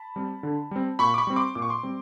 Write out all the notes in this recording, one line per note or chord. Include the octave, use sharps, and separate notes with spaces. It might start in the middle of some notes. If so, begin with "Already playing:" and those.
Already playing: A5 B5
G3 C4
D3
G3 C4
A#2 B5 C#6
D6
B5 C#6
G3 C4
C6 D6
A#2 D6
C#6
C6 D6
G3 C4